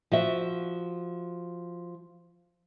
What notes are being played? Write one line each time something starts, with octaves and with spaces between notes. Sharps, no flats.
F3 F#4 E5